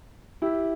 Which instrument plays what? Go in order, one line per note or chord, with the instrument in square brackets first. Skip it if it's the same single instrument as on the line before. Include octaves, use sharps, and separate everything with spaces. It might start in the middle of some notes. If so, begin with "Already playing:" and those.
[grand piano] E4 G4